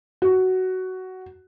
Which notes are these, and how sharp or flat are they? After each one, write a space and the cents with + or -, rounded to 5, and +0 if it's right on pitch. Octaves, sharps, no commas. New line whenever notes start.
F#4 +10